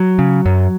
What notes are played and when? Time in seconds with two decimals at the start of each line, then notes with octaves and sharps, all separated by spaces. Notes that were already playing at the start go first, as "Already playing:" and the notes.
Already playing: F#3
0.19 C#3
0.46 F#2